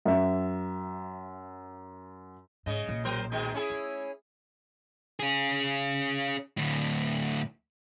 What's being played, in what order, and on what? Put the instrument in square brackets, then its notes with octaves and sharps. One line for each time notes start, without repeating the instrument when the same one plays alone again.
[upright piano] F#2 E5
[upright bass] G#2 [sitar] C#3 D#5
[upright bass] B1 A#2
[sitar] F#3 A#4 C5
B2 D#3 G#3
C#4 E4 G#4
[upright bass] A3
[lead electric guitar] C#4 G#4
D2 A2